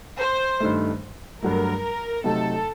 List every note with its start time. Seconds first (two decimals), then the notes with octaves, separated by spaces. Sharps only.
0.20 C5
0.60 G2 D#3 A3
1.42 G2 F#3 A3 A#4
2.24 C3 F#3 A3 D#4 A4